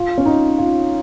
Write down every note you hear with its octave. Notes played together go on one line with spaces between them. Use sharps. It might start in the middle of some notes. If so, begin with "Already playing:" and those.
Already playing: F4
C#4
D#4
F4